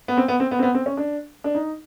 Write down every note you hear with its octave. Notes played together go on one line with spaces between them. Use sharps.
B3
C4
B3
C4
B3
C4
B3
C4
C#4
D4
D4
D#4